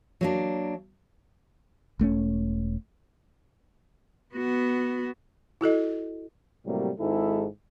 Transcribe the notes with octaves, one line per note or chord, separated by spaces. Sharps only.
F#3 A#3 D4
E1 A3 C4 C#4
B3 F#4
E4 F#4 A4 D#5
A2 C3 F#3 G3 A#3
G#1 G#2 E4 G#4 A4